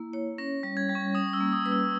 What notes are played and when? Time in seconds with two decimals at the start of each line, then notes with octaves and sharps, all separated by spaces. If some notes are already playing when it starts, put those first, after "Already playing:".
Already playing: A#3 E4
0.13 C#5
0.38 C#4 A#6
0.63 G3
0.77 G#6
0.89 G3
0.95 C#6
1.15 C#4 D#6
1.33 E6
1.40 A#3
1.53 D#6
1.66 B4
1.72 E6